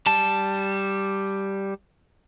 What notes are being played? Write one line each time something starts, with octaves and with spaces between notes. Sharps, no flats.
G3 A5